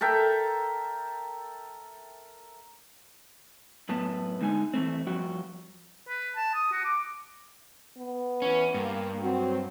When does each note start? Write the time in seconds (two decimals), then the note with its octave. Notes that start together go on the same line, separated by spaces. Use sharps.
0.01 A4 A#4 E5 G5
3.89 F#2 A2 B3 A5
4.41 D3 G#3 D#4 G#5
4.74 E3 A3 C4
5.07 G2 F3 F#4 G5
6.08 B4
6.36 A5
6.54 D#6
6.72 F#4
6.84 D6
7.98 B3
8.42 E3 C#4
8.74 G2 A#3
9.22 F#3 C4 F#4